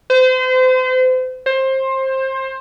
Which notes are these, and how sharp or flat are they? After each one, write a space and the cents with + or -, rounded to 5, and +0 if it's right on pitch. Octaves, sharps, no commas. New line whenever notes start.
C5 -35
C5 +25